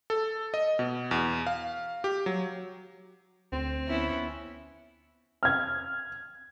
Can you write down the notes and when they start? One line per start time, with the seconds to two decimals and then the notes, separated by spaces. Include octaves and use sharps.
0.10 A4
0.54 D#5
0.79 B2
1.11 E2
1.47 F5
2.04 G4
2.26 F#3
3.52 D2 C4
3.87 B3 C#4 E4
5.43 F6 G#6